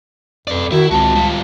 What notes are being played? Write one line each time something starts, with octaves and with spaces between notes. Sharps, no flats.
F2 B4 D5
D#3 E4 F#4
C#2 C4 F#4 A5
G3 F4